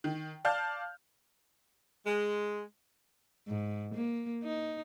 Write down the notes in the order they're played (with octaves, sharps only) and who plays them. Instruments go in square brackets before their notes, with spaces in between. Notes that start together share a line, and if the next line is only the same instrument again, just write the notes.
[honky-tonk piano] D#3
D5 F5 A5 F6 G6
[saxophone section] G#3
[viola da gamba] G#2
A#3
D#4